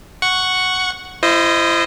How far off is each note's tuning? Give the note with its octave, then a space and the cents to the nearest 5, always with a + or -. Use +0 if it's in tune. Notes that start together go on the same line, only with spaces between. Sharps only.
F#5 +0 C#6 +0
E4 +35 C5 +0 D#5 -5